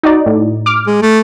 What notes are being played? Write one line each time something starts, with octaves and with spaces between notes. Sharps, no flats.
D#4 F#4 D5
A2
D6 F6
G#3
A3